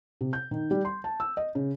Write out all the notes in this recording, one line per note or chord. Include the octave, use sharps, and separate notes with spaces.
C3
G6
D#3
G3
C6
A5
E6
D#5
C#3